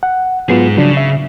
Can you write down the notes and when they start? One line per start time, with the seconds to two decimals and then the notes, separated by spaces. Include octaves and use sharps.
0.03 F#5
0.49 G#2 F#3 B3 F4 G#4
0.77 C#3 F3 F#3 D4
0.97 E5